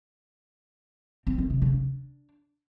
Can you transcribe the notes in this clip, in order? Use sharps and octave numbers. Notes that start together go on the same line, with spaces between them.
C4
D#3
C3
C#3
D4